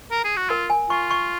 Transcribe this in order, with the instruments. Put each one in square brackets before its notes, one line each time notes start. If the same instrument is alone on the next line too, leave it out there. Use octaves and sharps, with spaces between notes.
[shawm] A#4
G#4
F#4
[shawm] F4 [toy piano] A#4
[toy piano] G#5
[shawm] F4 [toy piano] C#6
[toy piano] C#6